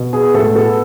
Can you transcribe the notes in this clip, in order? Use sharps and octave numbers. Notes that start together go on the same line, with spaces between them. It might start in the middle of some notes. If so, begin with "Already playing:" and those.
Already playing: B2
B3 G#4
A2 A4
B3 A4